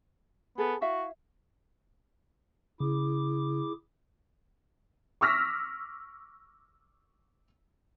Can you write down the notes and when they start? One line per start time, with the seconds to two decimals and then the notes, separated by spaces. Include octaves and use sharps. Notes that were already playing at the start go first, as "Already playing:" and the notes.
0.58 B3 G#4 A4
0.82 E4 F#4 E5 F5
2.80 C#3 E4 G#4 D6
5.21 C#6 D6 E6 F6 A#6 B6